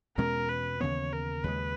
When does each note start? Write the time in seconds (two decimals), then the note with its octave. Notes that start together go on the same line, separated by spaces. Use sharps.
0.18 E2 B2 G#3 C#4 A#4
0.49 B4
0.80 D#2 C#3 E3 B3 C#5
1.12 A#4
1.44 D#2 C#3 G#3 B4